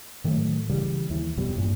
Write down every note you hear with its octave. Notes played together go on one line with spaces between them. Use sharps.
A2 D#3 F#3 A3
C#3 E3 G3
D#2 E3
F2 B2 G3
E2 G2 A#2